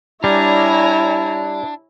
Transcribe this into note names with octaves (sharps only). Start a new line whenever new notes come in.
G3 D4 E4 C#5 G#5 A#5